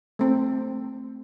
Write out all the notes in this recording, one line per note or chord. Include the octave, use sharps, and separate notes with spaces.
A3 C4